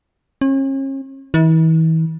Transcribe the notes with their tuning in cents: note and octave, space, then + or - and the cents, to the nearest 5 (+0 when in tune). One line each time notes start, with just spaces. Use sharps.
C#4 -40
E3 -40